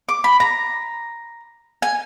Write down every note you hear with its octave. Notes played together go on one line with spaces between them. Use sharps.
D6
B5
A#5
G#5